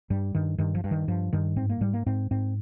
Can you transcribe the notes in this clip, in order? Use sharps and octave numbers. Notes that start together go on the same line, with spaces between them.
G2 G3
G2 D#3
G2 D#3
F3
G2
D#3
G2 F3
G2 D#3
G#2 C4
A#3
G#2 G3
A#3
G#2 C4
G#2 C4